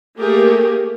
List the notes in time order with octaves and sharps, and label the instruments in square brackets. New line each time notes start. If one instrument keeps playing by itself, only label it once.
[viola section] A3 A#3 G4 G#4 A#4